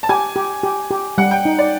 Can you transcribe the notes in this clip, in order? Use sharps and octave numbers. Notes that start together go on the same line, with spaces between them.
A5
G4 G#5
G4
G4
G4
G3 F#5
G5
D#4
D5